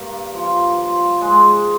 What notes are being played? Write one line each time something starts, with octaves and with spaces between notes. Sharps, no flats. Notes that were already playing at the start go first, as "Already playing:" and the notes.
Already playing: G2 A#3
F3
F3
G#2 G#3